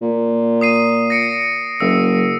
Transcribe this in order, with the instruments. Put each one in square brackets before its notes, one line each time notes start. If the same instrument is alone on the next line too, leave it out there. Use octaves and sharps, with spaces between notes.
[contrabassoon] A#2
[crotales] D#6 C7 D#7
A#6 C#7 D7
[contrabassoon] F#1 [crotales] E6